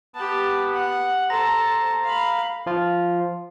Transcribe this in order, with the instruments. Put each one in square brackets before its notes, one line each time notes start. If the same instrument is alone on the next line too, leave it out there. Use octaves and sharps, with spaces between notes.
[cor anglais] B3 [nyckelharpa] G4 A5
[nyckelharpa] F#5
[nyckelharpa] A4 A5 [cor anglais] C5 [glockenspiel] A#5 A#6
[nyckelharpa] F5 B5
[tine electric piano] F3 F4